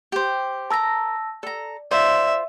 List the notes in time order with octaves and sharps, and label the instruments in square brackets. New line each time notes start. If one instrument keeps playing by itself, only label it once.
[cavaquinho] G4 C5
[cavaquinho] A#4 A#5 [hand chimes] A5 E6 A#6
[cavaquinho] A4 A#5 [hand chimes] D5
[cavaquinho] F4 C5 [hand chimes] D5 [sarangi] E5